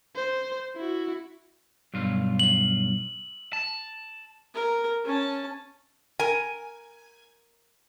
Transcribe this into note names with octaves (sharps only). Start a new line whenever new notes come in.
C5
E4 F#4
B1 G2 F4
F#7
A5
A#4
C#4 A5
A#4 G#5